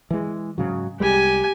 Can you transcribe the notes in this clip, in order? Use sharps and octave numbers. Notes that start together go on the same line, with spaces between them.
E3 G#3
G#2 C#3 F#3
C2 G3 G#3 G4 G#5